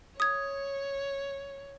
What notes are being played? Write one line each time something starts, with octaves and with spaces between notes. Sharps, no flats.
C#5 D#6 G#6